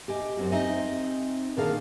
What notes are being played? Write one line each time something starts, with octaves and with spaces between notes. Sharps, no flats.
G4 D#5 G#5
F#2 C4 F#4
C4 D#4 D#5 E5 G#5
A#2 D#3 D4 G#4 A#4 F5